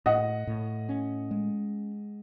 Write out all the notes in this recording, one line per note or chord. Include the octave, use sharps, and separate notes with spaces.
A2 D#5 F#5
A2
C#4
G#3